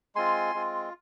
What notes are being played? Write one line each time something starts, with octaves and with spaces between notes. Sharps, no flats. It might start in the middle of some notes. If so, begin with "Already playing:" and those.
G#3 C4 F4 G#5 C6
G#3 C4 F4